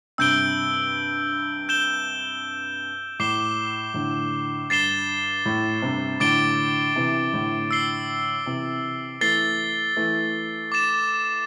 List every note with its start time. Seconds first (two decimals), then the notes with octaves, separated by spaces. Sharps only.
0.18 G2 C3 E6 G6 D7 G7
1.69 G6 E7 G7
3.19 A2 D6 C7 E7 G7
3.94 A2 D3
4.70 G2 A6 C7 E7 G7
5.46 A2
5.82 G2 C3
6.20 A2 D3 D6 A6 D7 G7
6.96 C3 E3
7.33 A2 D3
7.71 E6 C7 G7
8.46 C3 E3
9.21 E3 A3 A6 C7 G7
9.97 E3 A3
10.72 D6 A6 E7